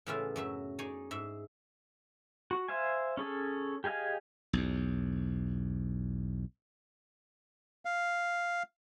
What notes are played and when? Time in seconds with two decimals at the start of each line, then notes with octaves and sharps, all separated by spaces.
0.06 A2 C#3 E3 B3 F4 E5
0.36 F#2 F#3 E5
0.79 D#4 G#4 C#5 D5
1.11 G#2 E5
2.51 F#4
2.68 C5 E5 F5 G#5
3.17 C#4 G#4 A4
3.84 G4 G#4 D#5 F5 G#5
4.53 B1 E2
7.85 F5